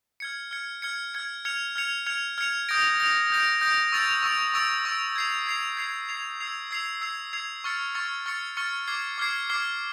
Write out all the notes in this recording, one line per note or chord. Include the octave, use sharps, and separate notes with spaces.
F6 G#6 C#7
F6 G#6 C#7
F6 G#6 C#7
F6 G#6 C#7
F6 G#6 C#7 F7
F6 G#6 C#7 F7
F6 G#6 C#7 F7
F6 G#6 C#7 F7
D#6 G6 A#6 D7
D#6 G6 A#6 D7
D#6 G6 A#6 D7
D#6 G6 A#6 D7
C#6 E6 A6 D7 F7
C#6 E6 A6 D7 F7
C#6 E6 A6 D7 F7
C#6 E6 A6 D7 F7
G#6 C7 F7
G#6 C7 F7
G#6 C7 F7
G#6 C7 F7
E6 G#6 C7 F7
E6 G#6 C7 F7
E6 G#6 C7 F7
E6 G#6 C7 F7
C#6 F6 A6 C#7
C#6 F6 A6 C#7
C#6 F6 A6 C#7
C#6 F6 A6 C#7
D6 F6 G#6 C7
D6 F6 G#6 C7
D6 F6 G#6 C7